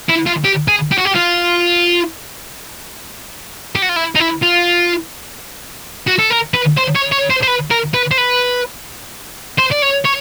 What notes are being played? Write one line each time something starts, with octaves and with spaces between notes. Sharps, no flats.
E4
F4
G4
G#4
G4
F#4
G4
F4
G4
F#4
F4
E4
D#4
E4
F4
F#4
A4
A#4
B4
C5
C#5
C#5
C5
C5
B4
A#4
B4
C5
B4
C5
D5
C#5
C#5